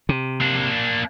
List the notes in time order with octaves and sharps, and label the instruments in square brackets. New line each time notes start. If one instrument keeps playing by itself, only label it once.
[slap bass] C3
[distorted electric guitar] A#3 D4